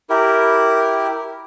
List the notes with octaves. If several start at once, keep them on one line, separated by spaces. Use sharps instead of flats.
E4 G4 A#4